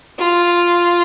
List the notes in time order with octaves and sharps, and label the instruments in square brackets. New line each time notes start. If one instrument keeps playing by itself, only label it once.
[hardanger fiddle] F4